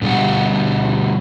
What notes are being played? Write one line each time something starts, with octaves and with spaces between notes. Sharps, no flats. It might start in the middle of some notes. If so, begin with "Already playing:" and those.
G#2 B2 D3 G3 F#5